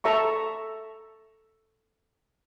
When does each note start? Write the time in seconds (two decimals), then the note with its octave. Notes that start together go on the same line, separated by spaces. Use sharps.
0.04 A4 E5 A#5 C#6